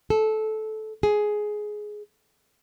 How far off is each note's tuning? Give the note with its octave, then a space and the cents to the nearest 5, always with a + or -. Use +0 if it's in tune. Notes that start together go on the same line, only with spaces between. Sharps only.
A4 -15
G#4 +10